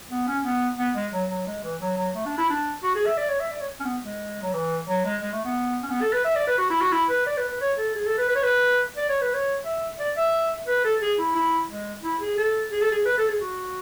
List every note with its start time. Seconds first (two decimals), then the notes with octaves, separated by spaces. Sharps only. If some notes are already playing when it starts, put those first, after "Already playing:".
0.11 B3
0.28 C#4
0.45 B3
0.78 B3
0.96 G#3
1.13 F#3
1.30 F#3
1.47 G#3
1.64 E3
1.81 F#3
1.98 F#3
2.15 A3
2.26 D4
2.38 E4
2.50 D4
2.83 F#4
2.95 G#4
3.06 E5
3.17 D5
3.29 C#5
3.40 E5
3.51 D5
3.61 C#5
3.80 C#4
3.85 B3
4.03 G#3
4.43 F#3
4.54 E3
4.89 F#3
5.05 G#3
5.22 G#3
5.33 A3
5.45 B3
5.83 C#4
5.90 B3
6.02 A4
6.13 B4
6.25 E5
6.36 D5
6.47 B4
6.58 F#4
6.70 E4
6.81 F#4
6.92 E4
7.10 B4
7.27 D5
7.38 B4
7.49 B4
7.61 C#5
7.78 A4
7.95 G#4
8.06 A4
8.18 B4
8.29 B4
8.35 C#5
8.43 B4
8.97 D5
9.09 C#5
9.21 B4
9.34 C#5
9.65 E5
9.99 D5
10.17 E5
10.68 B4
10.84 A4
11.02 G#4
11.19 E4
11.36 E4
11.69 G#3
12.04 E4
12.21 G#4
12.37 A4
12.72 G#4
12.82 A4
12.92 G#4
13.06 B4
13.18 A4
13.29 G#4
13.40 F#4